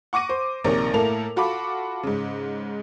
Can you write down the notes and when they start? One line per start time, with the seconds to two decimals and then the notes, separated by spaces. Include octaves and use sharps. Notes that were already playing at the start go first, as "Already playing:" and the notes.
0.13 F#5 C#6 D6 A#6 D#7
0.29 C5
0.64 A#1 C3 D#3 A#4 C#5 D5
0.94 A2 A#3 E4 A4 A#4 F7
1.36 F4 F#4 A4 B5 D6
2.03 G#2 C#3